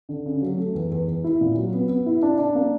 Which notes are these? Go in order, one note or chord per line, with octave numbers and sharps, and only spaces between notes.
D3
C#3
F#3
A3
E2
E2
E2
E4
A#2
F#3
B3
B3
E4
D4
D4
A#3